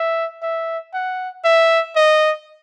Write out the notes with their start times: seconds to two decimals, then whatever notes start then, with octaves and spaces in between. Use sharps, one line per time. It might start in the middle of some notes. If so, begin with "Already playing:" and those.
Already playing: E5
0.42 E5
0.94 F#5
1.45 E5
1.96 D#5